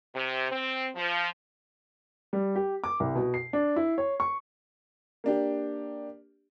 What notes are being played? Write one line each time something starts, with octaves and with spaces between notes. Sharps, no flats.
C3
C4
F3
G3
G4
D6
C2
B2
C7
D4
E4
C#5
C#6
A#3 D4 G4